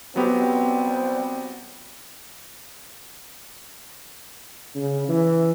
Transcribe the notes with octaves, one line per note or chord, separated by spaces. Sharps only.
F#3 B3 C4 G4
C#3
E3